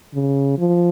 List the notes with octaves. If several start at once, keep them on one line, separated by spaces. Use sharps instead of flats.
C#3
F3